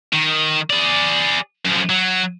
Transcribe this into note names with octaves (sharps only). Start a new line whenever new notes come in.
D#3
G#4 D5
F#2 F3
F#3